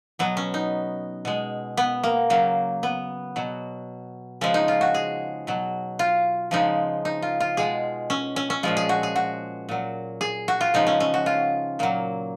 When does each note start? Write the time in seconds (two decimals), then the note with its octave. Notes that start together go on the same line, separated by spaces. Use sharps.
0.19 B2 F#3 B3
0.37 C#4
0.54 D#4
1.25 B2 G#3
1.77 B3
2.04 A#3
2.30 C#3 F#3 A#3
2.83 B3
3.36 B2 F#3
4.41 C#3 F3 G#3 C#4
4.54 D#4
4.68 F4
4.81 F#4
4.94 G#4
5.47 B2 F#3
5.99 F4
6.51 C#3 F3 G#3 D#4
7.05 D#4
7.22 F4
7.40 F4
7.57 B2 G#3 G#4
8.10 C#4
8.36 C#4
8.50 C#4
8.63 A#2 F3 G#3 F4
8.77 G#4
8.89 F#4
9.03 G#4
9.16 F#4
9.69 A#2 F#3
10.21 G#4
10.48 F#4
10.61 F4
10.74 C#3 F3 G#3 D#4
10.87 C#4
11.00 C#4
11.14 F#4
11.26 F4
11.79 A#2 F#3 A#3